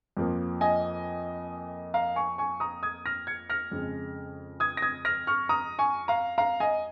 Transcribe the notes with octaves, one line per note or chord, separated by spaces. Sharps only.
F2 F3 A#3
D#5 G#5
F5 A#5
G#5 C#6
G#5 C#6
A#5 D#6
D#6 G#6
F6 A#6
G#6 C#7
F6 A#6
F2 C#3 G#3
D#6 G#6
A#6
D#6 G#6
F6 A#6
C#6 F6
A#5 D#6
G#5 C#6
F5 A#5
F5 A#5
D#5 G#5